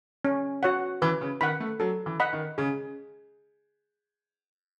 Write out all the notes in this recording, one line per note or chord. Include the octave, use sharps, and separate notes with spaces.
C#4
F#4 C#5 F#5
E3 B4
C#3
D#3 F#5 B5
A3
F#3 A4
E3
D#5 F#5 B5
D#3
C#3 G#4